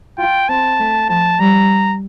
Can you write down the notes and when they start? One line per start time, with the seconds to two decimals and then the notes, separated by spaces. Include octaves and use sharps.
0.18 F4 G5
0.49 C4 A5
0.80 A3
1.09 F3 A5
1.39 G3 A#5